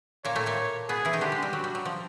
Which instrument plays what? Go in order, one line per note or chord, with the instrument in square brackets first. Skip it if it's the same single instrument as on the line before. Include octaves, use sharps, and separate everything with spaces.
[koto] A#2 A#3 [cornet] C#5
[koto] A2 A3
A#2 A#3
[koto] B2 B3 [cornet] G#4
[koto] E3 E4
D#3 D#4
[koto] D3 D4 [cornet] G4
[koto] G#3
G3
[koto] F#3 [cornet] F#4
[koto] G3
F#3
F3